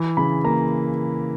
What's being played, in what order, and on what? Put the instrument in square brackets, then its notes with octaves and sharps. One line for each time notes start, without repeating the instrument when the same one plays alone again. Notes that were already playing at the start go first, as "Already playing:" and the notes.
Already playing: [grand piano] E3
C#3 B5
A#3 A#5